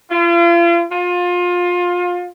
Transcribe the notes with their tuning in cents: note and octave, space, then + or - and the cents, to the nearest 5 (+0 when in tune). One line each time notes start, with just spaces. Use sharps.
F4 -40
F4 +25